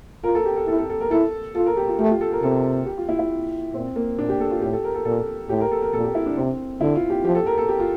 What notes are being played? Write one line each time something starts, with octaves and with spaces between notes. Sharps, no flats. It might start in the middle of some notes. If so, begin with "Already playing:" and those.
F4 A#4
A4
G4
A4
E4 A4
A4
A4
A#4
E4 A4
F4 A4
A#4
G4
F4
A3 G4
F4
A4
A#4
C3 A4
G4
F4
E4
E4
A#2 C4
A#3
A#2 D4
G4
A4
F4
A2 G4
A4
A#4
A4
A#2 A4
A2 G4
A#4
A4
A#4
A#2 A4
G4
E4
D4
C3 C4
D3 E4
F4
G4
F3 G4
A4
A#4
A4
G4
F4